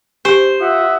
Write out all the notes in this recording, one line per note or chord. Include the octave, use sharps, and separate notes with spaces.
G4 C5 G#5
F4 E5 F#5 D#6